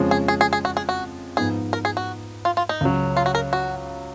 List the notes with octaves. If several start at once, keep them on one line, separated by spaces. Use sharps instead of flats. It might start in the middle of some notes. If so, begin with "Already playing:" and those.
Already playing: F2 C#3 F3 G#3 C#4
G#4
G#4
G#4
G#4
F#4
G#4
F#4
G#2 F3 B3 D#4 G#4
A#4
G#4
F#4
F4
F4
D#4
C#2 C#3 F#3
F4
F#4
A#4
F#4